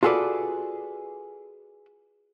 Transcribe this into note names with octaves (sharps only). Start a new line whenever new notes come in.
F4 F#4 G#4 A4 B4 D5